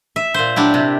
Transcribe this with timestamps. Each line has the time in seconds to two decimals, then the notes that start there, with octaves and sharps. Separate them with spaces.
0.16 E5
0.34 A#2 C5
0.56 F#3 D4 E4 G4
0.74 C3